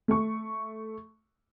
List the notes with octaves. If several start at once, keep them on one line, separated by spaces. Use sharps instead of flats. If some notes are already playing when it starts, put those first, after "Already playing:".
A3 C#6